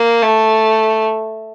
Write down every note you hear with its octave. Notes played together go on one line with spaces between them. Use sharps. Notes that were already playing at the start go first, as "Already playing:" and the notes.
Already playing: A#3
A3